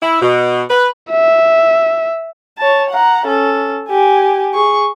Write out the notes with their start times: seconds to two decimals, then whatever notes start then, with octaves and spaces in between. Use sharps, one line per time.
0.02 E4
0.22 B2
0.70 B4
1.11 E5
2.58 C#5 A5
2.90 F#5 A#5
3.26 C#4 A4
3.89 G4 G#5
4.54 G#4 C#6